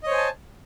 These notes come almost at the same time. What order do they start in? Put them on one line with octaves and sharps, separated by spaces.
D#5 C#5 C5 G#5 A5